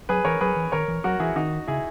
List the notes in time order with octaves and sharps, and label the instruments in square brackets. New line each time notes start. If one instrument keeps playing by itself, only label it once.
[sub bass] F#3 [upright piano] G#4 B4
[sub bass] E3 [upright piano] A#4 C#5
[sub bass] F#3 [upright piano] G#4 B4
[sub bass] E3
[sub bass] D#3 [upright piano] A#4 C#5
[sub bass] E3
[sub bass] F#3 [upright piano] F#4 A#4
[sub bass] E3 [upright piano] E4 G#4
[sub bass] D#3 [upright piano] D#4 F#4
[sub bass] C#3 [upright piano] E4 G#4